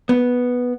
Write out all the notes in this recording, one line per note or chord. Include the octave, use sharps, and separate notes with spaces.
B3